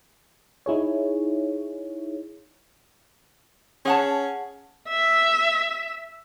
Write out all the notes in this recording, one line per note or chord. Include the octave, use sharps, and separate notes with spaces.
D#4 E4 G#4 C#5
C#4 G#4 F#5 A5
E5